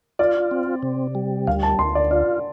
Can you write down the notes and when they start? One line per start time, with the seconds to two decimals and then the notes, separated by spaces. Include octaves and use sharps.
0.19 F4 D5
0.51 C4
0.83 C3
1.15 G3
1.47 D2 F5
1.63 A5
1.79 D2 C6
1.95 D5
2.11 F4 D5